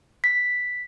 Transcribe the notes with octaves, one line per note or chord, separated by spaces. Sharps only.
B6